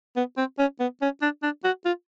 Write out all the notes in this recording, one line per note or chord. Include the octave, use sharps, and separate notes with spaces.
B3
C4
C#4
B3
C#4
D4
D4
F#4
F4